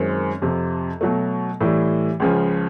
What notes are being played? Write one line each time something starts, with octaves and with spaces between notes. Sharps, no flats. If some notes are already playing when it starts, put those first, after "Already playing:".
Already playing: F#2 D#3 G#3 C4
F2 C3 F3
B2 F#3 A3
A2 E3 G3
C#2 C#3 F3